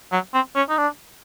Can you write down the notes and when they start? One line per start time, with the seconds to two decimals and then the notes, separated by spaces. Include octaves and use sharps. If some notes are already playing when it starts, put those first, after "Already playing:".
0.12 F#3
0.34 C4
0.56 C#4
0.69 D#4
0.78 D4